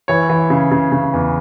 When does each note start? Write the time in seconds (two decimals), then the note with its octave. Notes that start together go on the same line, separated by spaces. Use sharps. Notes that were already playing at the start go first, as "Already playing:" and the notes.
0.08 E3 C#5
0.29 E3
0.50 C#3
0.71 C#3
0.92 C#3
1.13 E2